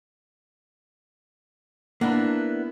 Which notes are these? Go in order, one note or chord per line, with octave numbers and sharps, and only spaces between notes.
A#3 B3 D4 E4